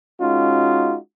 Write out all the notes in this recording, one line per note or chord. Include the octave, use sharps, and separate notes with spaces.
G#3 C#4 D#4 F4 F#4